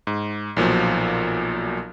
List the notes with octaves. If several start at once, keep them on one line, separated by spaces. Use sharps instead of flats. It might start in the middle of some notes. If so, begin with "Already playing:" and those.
G#2
B1 A#2 F3 F#3